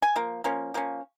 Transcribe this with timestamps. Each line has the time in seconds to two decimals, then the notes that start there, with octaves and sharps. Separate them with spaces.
0.02 G#5
0.16 F3 A#3
0.44 F3 A#3 C#4
0.74 F3 A#3 C#4